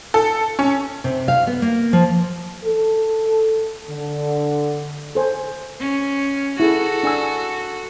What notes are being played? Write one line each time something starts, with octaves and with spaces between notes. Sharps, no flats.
A4
C#4
C3
F5
B3
A#3
F3
A4
D3
A4 C5 G#5
C#4
E4 F#4 G#4 A4
D4 G#5 E6